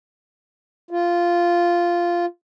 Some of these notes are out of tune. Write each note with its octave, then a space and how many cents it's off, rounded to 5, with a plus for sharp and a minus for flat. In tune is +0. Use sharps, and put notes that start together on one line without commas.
F4 -5